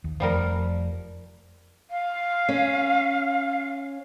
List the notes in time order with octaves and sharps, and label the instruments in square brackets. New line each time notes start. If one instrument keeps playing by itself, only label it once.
[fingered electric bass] D#2
[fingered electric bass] F1 F2 A3 [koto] F3 G3 A#4
[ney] F5
[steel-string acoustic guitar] C#4